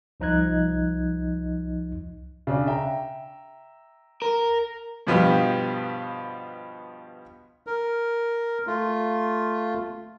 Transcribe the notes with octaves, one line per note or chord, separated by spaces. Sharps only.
C2 F3 D#4 D#5 F#6 G#6
C#3 D4
E5 G5 A#5
A#4
G2 B2 F3 B3 G4 F5
A#4
A3 F4